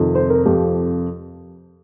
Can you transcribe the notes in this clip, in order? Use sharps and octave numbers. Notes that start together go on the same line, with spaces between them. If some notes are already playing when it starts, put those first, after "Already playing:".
Already playing: F2 C3 D#3
C5
A#4
F2 C3 F3 G4